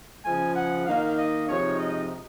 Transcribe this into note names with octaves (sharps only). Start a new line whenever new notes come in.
C#3 F3 G#3 G#5
F#5
D#3 A#3 D#4 F5
D#5
C3 F3 G#3 D#4 C#5
D#5